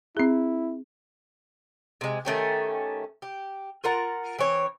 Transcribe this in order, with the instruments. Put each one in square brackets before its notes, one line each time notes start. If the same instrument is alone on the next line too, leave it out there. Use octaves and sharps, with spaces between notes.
[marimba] C4 G#4 [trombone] E4
[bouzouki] C3 G#3
D#3 A3 C#4 G4
G4
F4 A#4 F#5 A#5
E3 C4 C#5